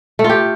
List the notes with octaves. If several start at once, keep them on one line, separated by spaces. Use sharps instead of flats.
A3
F4
G4